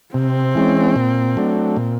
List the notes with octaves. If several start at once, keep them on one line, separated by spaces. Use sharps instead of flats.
C3 C4
E3 G#3 C#4
A#2
F#3 A3 D4
A#2